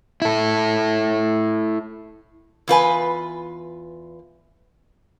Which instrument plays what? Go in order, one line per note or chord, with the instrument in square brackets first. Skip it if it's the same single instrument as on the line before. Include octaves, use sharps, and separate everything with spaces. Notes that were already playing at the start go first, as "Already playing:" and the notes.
[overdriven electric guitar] E4 A4
[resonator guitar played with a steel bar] E2 F4 B4 G#5